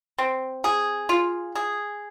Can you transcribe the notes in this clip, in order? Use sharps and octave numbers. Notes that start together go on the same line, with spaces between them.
C4
G#4
F4
G#4